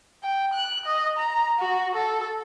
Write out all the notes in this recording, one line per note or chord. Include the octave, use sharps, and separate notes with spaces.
G5
F#6
D#5
A#5
F#4
A4